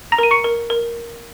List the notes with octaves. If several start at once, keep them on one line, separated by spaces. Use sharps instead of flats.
A#5 A#6
A#4 D#7
C#6 C#7
A#4
A#4